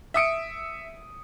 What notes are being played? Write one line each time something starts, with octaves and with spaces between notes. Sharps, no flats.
E5 D#6 C#7 D7